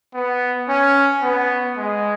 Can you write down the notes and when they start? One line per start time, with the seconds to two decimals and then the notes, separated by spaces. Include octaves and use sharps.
0.15 B3
0.69 C#4
1.23 B3
1.77 G#3